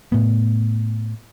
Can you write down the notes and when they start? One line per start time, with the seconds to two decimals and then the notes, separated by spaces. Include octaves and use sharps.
0.12 A2 B3